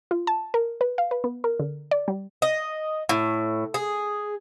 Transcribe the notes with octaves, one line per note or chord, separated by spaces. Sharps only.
F4
A5
A#4
B4
F5
B4
B3
A#4
D3
D5
G3
D#5
A2
G#4